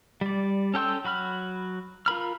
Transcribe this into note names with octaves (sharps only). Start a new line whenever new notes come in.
G3 D5
C#4 A4 G5 C6 E6
F#3 F#4 B5 F6
F4 A#4 B5 F6